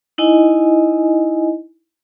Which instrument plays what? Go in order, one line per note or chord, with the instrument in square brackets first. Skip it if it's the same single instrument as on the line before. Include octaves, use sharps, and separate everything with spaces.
[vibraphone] D#4 E4 D#5 G#5